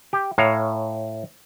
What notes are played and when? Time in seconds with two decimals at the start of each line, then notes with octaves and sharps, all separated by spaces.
0.13 G4
0.38 A2 C#5 F5 A#5